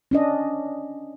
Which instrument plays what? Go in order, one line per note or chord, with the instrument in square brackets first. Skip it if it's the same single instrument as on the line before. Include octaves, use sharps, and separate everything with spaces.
[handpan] C#4 D4 D#5